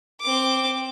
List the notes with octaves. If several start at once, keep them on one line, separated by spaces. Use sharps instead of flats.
C4 D6